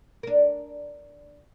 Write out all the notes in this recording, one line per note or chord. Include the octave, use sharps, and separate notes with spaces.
D4 A#4